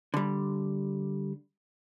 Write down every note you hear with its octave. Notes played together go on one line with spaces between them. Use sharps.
D3 G3